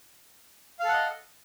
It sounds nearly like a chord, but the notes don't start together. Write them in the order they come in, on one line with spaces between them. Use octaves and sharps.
F5 A4 F#5 D#5